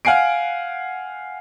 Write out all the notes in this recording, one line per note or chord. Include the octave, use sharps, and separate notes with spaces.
F5 F#5 G#5 C7 D7